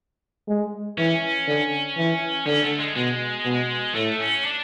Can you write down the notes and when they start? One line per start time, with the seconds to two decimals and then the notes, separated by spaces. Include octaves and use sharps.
0.48 G#3
0.98 E3 C#4
1.47 D3
1.97 E3
2.46 D3 C#4
2.63 A3
2.80 G#3
2.96 B2 G#3
3.45 B2
3.94 A2 A3
4.20 C#4
4.45 D4